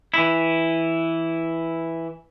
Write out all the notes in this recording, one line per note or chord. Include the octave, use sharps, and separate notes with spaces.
E3 E4